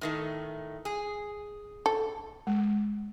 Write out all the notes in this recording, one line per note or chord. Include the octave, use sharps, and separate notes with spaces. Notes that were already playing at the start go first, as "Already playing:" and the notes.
A2 D#3 A3
G#4
A4
G#3